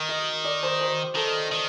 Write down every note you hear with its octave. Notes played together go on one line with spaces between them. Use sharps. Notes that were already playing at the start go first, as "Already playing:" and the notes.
Already playing: D#3
D#5
D5
C5
C5
D#3 A4
D#3